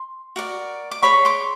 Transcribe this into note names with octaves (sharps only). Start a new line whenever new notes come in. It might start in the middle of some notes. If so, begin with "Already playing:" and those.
Already playing: C6
F#4 A#4 D5
D6
G#4 C#5 B5 C#6
C6 D6